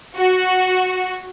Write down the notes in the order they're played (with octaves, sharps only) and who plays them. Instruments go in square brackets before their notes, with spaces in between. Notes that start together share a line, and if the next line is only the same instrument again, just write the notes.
[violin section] F#4